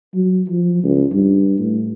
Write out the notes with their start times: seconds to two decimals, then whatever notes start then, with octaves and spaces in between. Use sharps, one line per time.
0.14 F#3
0.48 F3
0.84 C#2
1.12 G2
1.59 A2